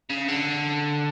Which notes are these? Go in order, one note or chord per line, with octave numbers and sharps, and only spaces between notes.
C#3
D3